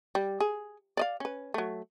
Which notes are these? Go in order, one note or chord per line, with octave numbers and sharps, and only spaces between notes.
G3
G#4
D5 D#5 F5
C#4 B4
F#3 A3